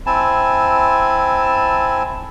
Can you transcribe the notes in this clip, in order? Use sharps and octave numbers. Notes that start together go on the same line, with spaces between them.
C4 E4 G#5 A5